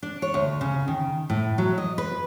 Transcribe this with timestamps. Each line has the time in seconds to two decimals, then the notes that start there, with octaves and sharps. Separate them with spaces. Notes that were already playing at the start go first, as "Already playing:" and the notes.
0.03 D4
0.22 C#5
0.34 D2
0.61 C#3
0.88 D#3
1.30 A2
1.58 F#3
1.78 D#5
1.98 B4